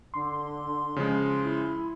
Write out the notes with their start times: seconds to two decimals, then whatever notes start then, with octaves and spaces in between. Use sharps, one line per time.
0.14 D3 C6
0.96 C#3 F3 G#3
1.42 E4